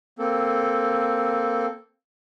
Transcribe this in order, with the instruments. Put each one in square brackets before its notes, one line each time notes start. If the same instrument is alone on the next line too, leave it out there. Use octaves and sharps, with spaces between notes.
[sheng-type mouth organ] A#3 C4 A4